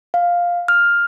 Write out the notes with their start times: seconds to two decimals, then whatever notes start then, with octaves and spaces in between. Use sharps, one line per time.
0.14 F5
0.68 F6